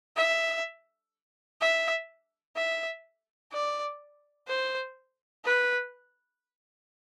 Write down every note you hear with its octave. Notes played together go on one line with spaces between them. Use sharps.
E5
E5
E5
D5
C5
B4